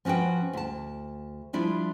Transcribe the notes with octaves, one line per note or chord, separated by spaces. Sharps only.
F3 C#4 F#4 B4 G5
D2 A5
F3 G3 D4 E4 F4